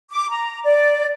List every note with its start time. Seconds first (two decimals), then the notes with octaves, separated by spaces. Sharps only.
0.11 D6
0.30 A#5
0.63 D5